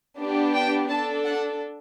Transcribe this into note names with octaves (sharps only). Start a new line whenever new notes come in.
B3 D4 G4
G5
D4 A4 A5
F#5